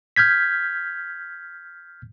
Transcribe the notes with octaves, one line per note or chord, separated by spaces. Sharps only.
F6 G6 G#6 B6